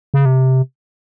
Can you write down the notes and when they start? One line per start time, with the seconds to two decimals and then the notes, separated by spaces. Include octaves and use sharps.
0.14 C#3
0.25 C3